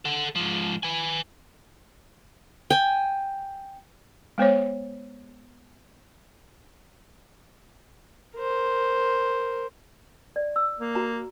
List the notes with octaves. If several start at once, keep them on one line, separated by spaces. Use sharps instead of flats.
A4 F#5
G#2 F3
B4 G#5
G5 G#5
G#3 B3 C5 C#5
A#4 C5
D5
E6
A#3
F#4 A#5